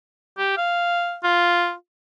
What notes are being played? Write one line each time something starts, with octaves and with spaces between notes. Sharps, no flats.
G4
F5
F4